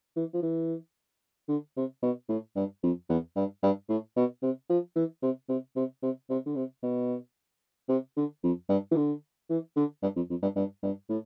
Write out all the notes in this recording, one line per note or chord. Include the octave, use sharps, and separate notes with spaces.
E3
F3
E3
D3
C3
B2
A2
G2
F2
E2
G2
G2
A2
B2
C3
F3
E3
C3
C3
C3
C3
C3
D3
C3
B2
C3
D3
F2
G2
E3
D3
E3
D3
G2
F2
F2
G2
G2
G2
A2